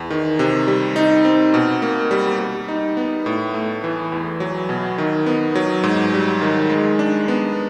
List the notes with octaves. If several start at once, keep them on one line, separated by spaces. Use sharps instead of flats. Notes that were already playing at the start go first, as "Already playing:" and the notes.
Already playing: E2
D#3
C3
G3
D#4
C4
B2
A#3
G3
G3
D#4
B3
A2
A3
E3
E2
F#3
B2
D#3
B3
F#3
G#2
G3
D#3
G#3
D4
B3